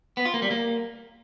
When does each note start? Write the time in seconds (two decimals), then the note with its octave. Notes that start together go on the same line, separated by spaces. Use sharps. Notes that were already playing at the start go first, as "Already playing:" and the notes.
0.17 B3
0.25 F4
0.34 A#3
0.42 G3
0.51 A#3